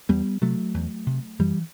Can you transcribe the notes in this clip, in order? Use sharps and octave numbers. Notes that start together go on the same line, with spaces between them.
E2 G3 B3
C3 F#3 A3
E2
C3
F#2 E3 G3